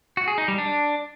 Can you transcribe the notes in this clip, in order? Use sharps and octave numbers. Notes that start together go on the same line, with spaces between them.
F#4
G#4
D#4
G3
D4